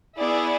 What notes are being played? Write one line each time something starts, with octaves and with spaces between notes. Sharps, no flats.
B3 E4 G#4 D5